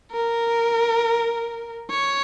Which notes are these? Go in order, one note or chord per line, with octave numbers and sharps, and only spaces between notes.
A#4
C#5